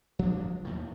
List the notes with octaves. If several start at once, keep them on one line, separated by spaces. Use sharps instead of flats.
F3 D4
D#2 A2 D#3